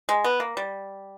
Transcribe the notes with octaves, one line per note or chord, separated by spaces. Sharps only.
G#3
B3
A#3
G3